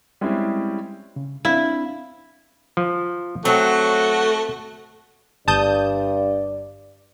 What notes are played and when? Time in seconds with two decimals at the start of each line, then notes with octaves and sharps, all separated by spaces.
0.21 G3 G#3 C4 C#4 E4
1.16 C#3
1.45 C4 D4 E4 F5
2.77 F3
3.45 F#3 A3 C4 F#4
5.48 G1 G2 D5 A5 D#6 G6